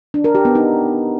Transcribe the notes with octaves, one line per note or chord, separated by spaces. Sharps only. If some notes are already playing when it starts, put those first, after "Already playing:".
D4
A#4
G4
B3
D#4